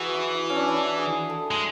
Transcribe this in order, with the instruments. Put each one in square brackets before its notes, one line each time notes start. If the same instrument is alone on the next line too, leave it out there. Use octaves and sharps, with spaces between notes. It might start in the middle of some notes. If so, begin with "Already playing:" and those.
Already playing: [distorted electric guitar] E3 [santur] F#4 G#4
[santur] E4
E4
C#4
D4
E4
D4
G#4
A4
[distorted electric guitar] G#3